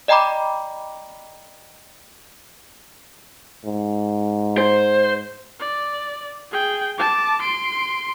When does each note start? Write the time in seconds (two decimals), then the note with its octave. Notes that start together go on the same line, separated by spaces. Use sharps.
0.08 D5 D#5 G5 A#5 B5 D6
3.65 G#2
4.58 C5
5.60 D5
6.51 G#4 G5
6.98 A5 D6
7.42 C6 D7